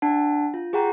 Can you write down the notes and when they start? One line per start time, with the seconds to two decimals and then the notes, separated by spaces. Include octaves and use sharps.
0.02 D4 F#5 A5
0.54 F4
0.73 G4 G#4 F#5 G5 A#5